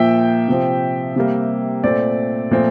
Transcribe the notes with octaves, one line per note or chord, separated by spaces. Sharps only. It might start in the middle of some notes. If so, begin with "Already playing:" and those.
Already playing: A#2 F3 A#3 E5 G5
C3 F3 C4
C3 G3 A#3
A#2 A3 C4 D5
A#2 F3 A3 C4